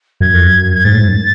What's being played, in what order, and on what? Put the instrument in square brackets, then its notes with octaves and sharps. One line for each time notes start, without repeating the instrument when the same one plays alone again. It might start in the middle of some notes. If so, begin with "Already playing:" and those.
[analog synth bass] F#2 [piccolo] G#6
[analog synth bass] F2
F#2
[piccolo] G#6
[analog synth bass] G#2 [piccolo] A6
[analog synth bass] A2
G#2
F#2